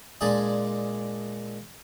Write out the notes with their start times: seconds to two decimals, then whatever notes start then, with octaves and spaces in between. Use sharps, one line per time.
0.21 A#2 G#3 D4 D5 G#5 D#6